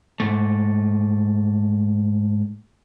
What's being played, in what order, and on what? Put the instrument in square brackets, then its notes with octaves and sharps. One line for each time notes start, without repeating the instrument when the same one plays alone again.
[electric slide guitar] G#2 A3